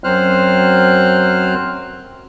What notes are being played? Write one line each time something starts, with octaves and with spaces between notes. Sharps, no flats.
F#2 F#3 C4 C5 F6 F#6